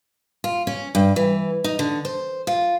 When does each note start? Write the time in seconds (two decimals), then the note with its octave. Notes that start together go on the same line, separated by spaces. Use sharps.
0.44 F4
0.67 C#4
0.95 G2
1.16 E3
1.64 D#4
1.79 D3
2.05 C5
2.47 F4